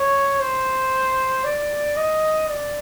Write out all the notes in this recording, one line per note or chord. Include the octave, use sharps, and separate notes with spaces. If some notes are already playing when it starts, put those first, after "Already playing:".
Already playing: C#5
C5
D5
D#5
D5